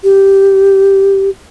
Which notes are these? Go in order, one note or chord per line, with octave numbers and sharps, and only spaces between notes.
G4